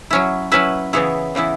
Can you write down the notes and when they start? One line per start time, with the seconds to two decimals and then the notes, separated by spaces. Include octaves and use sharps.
0.11 F#3 C#4 E4
0.52 F#3 C#4 E4 B4 E5
0.93 C#3 E3 B3 E4 G#4 C#5
1.35 C#3 E3 B3 E4